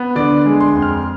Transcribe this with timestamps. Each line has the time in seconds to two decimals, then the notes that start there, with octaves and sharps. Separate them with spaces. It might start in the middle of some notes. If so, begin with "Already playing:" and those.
Already playing: B3
0.15 D3 D5
0.45 G#3
0.60 C6
0.75 F2
0.82 F6